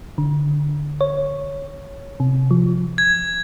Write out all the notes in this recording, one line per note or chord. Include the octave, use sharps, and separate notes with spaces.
D3
C#5
C3
F3
G#6